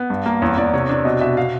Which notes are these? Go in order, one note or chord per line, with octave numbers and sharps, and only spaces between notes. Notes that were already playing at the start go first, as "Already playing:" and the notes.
Already playing: B3
G2
A#3
E2 C#5
E2 D5
C3 C#5
D4
B2 D#5
B2 E5
F5